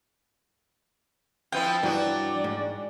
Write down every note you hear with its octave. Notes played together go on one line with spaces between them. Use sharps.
F3 B3 E4 G5
G2 E3 F#3 F#4 D5
G#2